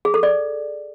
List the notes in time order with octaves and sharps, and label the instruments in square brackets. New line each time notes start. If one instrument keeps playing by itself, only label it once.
[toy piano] G#4
A4
D5